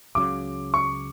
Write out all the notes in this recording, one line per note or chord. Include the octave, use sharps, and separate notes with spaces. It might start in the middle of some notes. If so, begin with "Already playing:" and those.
C#2 C#3 F#3 D6
C#6